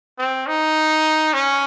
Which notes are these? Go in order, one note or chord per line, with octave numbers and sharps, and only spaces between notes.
C4
D#4
C#4